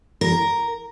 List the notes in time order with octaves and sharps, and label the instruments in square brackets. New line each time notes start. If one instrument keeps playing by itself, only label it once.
[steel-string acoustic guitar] A#4